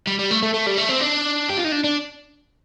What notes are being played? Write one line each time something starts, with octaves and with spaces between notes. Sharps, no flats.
G3
G3
A3
A3
A3
G3
A3
C4
D4
G4
F4
D#4
D4
D4